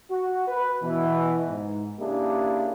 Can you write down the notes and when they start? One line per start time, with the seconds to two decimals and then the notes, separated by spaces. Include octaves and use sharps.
0.11 F#4
0.48 B4
0.82 B2 E3
1.48 G#2
2.00 C#3 A#3 D4 E4 G4 G#4